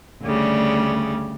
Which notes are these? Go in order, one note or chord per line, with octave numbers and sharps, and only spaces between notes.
D2 C#3 G3